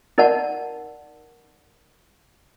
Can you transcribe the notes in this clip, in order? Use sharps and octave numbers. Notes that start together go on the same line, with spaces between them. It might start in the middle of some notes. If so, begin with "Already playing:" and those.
D#4 A#4 D5 F#5 A5